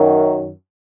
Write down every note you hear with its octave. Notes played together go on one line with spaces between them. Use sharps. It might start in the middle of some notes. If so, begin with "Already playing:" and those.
Already playing: F#2 D#3 F#3